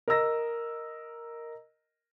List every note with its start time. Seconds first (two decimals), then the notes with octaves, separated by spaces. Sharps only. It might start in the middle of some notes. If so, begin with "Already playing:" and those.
0.08 A#4 D#5 A#5 E6 A#6